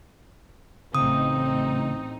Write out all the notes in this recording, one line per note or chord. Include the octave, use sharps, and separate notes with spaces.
A1 A2 C#3 C4 D#4 D#6